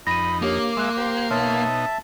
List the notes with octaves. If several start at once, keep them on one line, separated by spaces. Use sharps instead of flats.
F2 D#4 B5 A#6 D#7
A#3 D4 G4 C#5 D6
G#3 E5 C6 F#6
G4 C5
B2 D#4 C#5 E5 A5 C6 F6